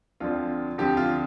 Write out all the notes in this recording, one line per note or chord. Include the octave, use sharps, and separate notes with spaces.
D2 D3 F3 C4 F4
D2 D3 F3 C4 G4
F4